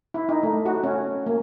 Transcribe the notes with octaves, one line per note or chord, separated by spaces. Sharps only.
E4
D#4
A3
F#4
C#4
A#3